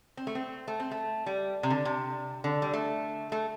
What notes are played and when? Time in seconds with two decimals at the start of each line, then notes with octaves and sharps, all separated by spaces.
0.17 C4
0.27 A3
0.35 C4
0.68 A3
0.80 C4
0.91 A3
1.26 G3
1.63 C3
1.70 D3
1.85 C3
2.44 D3
2.62 G3
2.73 A3
3.32 A3